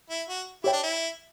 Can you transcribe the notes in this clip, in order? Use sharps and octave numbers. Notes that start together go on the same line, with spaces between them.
E4
F#4
E4 G4 C#5 G5
D4
E4